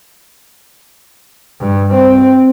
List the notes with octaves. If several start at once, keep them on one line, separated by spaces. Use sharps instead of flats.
G2
C4